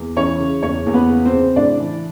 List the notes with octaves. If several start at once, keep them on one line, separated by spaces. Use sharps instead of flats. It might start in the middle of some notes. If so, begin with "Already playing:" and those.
Already playing: E2
E3 C#4 C#5
C#3
E2 C#4 C#5
E2
B3 B4
C#3
C4 C5
C#3
A2 D4 D5
E3